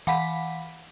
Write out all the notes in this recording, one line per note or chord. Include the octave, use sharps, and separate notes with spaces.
E3 F5 F#5 B5 B6